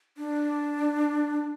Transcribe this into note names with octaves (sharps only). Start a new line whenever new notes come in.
D4